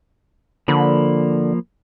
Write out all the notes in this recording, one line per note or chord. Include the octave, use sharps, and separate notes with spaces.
D3 F3 A#3 B5